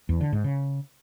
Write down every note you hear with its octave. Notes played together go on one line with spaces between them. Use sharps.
E2
D3
G#2
C#3